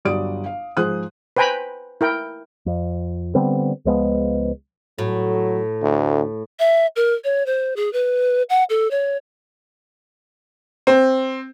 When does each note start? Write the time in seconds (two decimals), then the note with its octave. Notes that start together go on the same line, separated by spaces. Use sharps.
0.05 G1 F#3 G3 D5 D#6 D7
0.46 F5
0.77 G#2 F3 G#4 C5 D#6 F#6
1.37 B4 C5 G5 G#5 A#5 B5
2.01 E4 A#4 G5
2.66 F2
3.35 D3 G3 B3 C4
3.85 C#2 F3 G#3 B3
4.98 A2 F#3
5.82 D2
6.59 E5
6.96 A#4
7.24 C#5
7.46 C5
7.76 G#4
7.93 B4
8.50 F#5
8.70 A4
8.91 C#5
10.87 C4